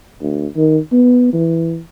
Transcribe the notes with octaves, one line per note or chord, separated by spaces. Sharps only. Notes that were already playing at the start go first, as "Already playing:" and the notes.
D2
D#3
B3
E3